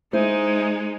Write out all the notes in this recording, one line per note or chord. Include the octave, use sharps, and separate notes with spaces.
G#3 D#4 E4 C5